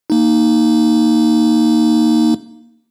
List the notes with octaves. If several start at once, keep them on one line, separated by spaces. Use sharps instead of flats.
A#3 D#4